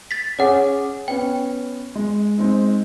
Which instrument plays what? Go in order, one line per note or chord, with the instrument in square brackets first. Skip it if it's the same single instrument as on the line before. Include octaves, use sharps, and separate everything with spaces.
[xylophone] A6 B6
[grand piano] C#4 G#4 D6 [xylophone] C#5 F#5
[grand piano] B3 C#4 [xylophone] G5
[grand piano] G#3
G#3 C4 D#4